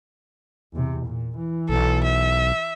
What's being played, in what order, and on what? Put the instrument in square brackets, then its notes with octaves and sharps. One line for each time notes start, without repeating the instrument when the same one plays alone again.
[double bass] E2 C3
A#2
E3
[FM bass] B1 [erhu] A4
[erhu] E5